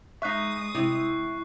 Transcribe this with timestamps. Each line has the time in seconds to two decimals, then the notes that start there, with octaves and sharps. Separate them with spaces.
0.22 G#3 D#4 E5 C#6 D#6 F#6 C7
0.75 C3 E4